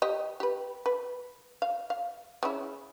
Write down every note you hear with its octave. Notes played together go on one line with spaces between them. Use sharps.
G4 D#5
G4 B4
B4
F5
F5
C#3 C#4 E4